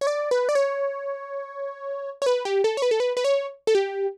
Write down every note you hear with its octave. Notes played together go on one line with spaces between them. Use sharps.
C#5
D5
B4
D5
C#5
C#5
B4
G4
A4
C#5
B4
A4
B4
B4
C#5
A4
G4